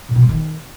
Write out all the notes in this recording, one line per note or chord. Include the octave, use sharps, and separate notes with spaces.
A#2
B2
F#3
D#3